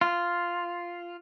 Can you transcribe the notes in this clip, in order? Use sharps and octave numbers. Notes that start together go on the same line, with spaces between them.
F4